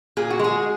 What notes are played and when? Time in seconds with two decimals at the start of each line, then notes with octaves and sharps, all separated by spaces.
0.17 A#2 G#4
0.30 F#4
0.39 G#3 G#4